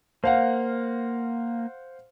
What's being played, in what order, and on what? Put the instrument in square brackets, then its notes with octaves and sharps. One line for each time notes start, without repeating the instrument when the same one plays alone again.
[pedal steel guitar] A#3 [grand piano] C5 F5 F#5